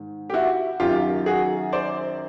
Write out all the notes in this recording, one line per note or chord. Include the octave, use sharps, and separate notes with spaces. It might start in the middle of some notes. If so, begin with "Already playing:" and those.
Already playing: G#2 D#3
G4
E4 F#4
F#2 D#3 F#3 F4 G4
F#4 G#4
C5 D5